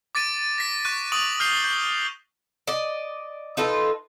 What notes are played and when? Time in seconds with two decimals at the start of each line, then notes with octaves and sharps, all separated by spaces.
0.15 D6 A6 D7 D#7
0.58 A#6 B6
0.85 C#6 F#6 D#7
1.12 C#6 D#6 D7 F7 F#7
1.40 F6 G6 C7 F7 G7
1.64 G6
2.67 D5 D#5
3.57 D#4 F4 A4 B4